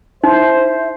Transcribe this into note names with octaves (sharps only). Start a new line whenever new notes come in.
D#4 E4 C5 E5